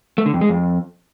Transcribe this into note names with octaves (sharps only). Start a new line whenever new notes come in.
A3
D3
F2
G#3
F2